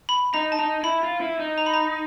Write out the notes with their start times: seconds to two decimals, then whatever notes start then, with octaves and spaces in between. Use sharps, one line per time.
0.09 B5
0.34 D#4 A#5
0.52 A5
0.59 D#4 A#5
0.83 E4 B5
1.03 F4
1.21 E4
1.39 D#4
1.58 A#5
1.66 B5
1.74 A#5